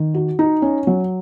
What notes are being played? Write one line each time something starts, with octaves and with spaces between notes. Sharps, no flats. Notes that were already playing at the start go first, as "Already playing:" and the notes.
Already playing: D#3
F#4
D#4
C#4
F#3